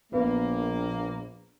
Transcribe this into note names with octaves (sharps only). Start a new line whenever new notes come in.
A#1 A#3 B3